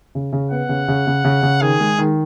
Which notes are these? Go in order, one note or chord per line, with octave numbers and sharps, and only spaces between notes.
C#3
C#3
B3 F#5
C#3
C#3
C#3
C#3
C#3
D#3 G#4
G#3
D#3